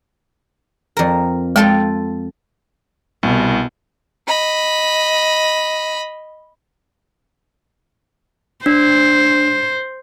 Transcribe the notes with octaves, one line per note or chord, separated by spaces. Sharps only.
F2 A#4
G#3 F4 A4 G5
C2 B2
D#5 B5
D4 C5